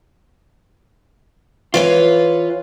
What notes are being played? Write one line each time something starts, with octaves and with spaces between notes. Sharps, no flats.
E3 F4 B4 C#5